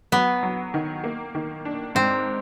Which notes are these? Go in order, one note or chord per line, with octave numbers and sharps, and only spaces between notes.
F#3 B3
F#3
D#3
A#3
D#3
D4
G#2 C4